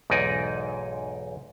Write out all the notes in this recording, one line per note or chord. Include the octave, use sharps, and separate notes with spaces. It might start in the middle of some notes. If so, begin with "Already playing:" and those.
B1 E2 G#2 D#4 D5 G#5